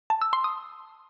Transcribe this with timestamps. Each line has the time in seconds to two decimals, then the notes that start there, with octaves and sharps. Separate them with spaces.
0.10 A5
0.21 E6
0.33 C6
0.44 D#6